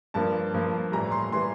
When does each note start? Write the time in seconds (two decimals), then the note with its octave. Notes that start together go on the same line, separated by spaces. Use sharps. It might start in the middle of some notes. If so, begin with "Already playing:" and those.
0.14 G2 F3 A#3 A5
0.54 G2 F3 A#3
0.92 A2 E3 G3 A#5
1.11 C6
1.31 A2 E3 G3 C6